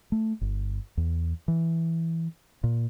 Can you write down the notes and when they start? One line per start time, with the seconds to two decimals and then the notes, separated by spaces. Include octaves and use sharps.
0.12 A3
0.41 G1
0.97 E2
1.48 E3
2.64 A#2